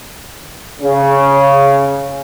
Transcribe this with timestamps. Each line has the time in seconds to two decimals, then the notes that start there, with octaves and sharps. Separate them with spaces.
0.82 C#3